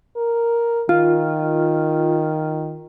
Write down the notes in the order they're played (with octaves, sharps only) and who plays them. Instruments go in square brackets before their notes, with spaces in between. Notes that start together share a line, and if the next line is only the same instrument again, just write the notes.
[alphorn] A#4
[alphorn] D#3 [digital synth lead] F4